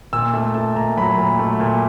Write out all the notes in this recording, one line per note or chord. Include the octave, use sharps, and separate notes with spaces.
A#2 E6
A3
A3 A5
A#2 A#5
F#3 B5
A#2
A3
A#2